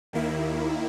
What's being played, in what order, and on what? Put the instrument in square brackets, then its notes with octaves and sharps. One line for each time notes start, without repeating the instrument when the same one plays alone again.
[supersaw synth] D#2 D#3 A#3 E4